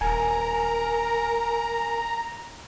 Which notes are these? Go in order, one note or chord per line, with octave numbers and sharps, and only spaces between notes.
D#1 A#4 G#5 A#5